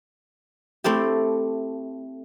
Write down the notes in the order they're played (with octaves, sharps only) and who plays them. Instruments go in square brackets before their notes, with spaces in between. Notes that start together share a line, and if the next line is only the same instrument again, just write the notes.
[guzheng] A3 C4 E4 G4